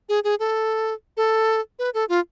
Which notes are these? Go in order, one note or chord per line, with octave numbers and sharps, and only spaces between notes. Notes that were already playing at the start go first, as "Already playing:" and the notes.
G#4
G#4
A4
A4
B4
A4
F4